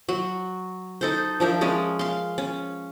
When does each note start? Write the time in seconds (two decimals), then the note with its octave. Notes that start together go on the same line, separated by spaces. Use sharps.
0.09 F#3 F#4
1.01 D#4 A4 C5
1.40 F3 D4 A#4 E5
1.61 G#3 C#4 A#4
1.99 F5 C6
2.38 C#4